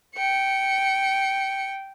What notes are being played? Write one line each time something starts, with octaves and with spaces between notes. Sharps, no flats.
G5 C#7